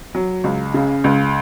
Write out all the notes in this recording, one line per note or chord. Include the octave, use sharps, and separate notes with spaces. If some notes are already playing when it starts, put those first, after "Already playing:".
F#3
C#2
C#3
C#2